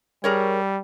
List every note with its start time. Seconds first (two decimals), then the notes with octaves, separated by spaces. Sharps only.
0.24 G3 G#4 A#4 C#5